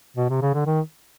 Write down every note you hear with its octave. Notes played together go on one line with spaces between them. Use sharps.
B2
C3
C#3
D3
D#3